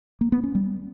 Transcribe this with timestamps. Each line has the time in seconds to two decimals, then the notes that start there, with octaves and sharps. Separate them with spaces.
0.21 A#3
0.32 B3
0.44 C#4
0.55 G3